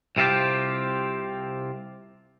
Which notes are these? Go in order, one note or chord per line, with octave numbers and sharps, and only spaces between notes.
C2 C3 C4 F4 G4